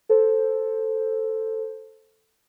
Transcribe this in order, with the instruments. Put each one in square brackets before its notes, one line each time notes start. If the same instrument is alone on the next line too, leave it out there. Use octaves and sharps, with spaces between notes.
[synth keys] A4 C5